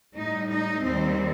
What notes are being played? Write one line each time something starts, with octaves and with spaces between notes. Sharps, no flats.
A2 G3 D#4
D#4
D#2 D#3 G3 C4